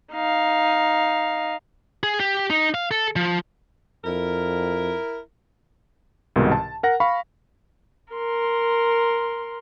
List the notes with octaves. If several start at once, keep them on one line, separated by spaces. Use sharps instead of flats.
D#4 F5
G#4
G4
D#4
F5
A4
F3
F2 E4 A#4
C2 G#2 B2 D#3
A5
A#4 F#5 A#6
F5 B5 C#6
A#4 C6